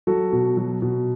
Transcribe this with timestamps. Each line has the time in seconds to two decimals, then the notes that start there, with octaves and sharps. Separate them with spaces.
0.07 F#3 F#4 A4
0.33 B2
0.57 F#3
0.82 B2